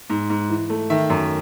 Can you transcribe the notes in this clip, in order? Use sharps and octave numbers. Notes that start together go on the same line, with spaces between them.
G#2
G#2
E3
A3
D#3 E5
F#2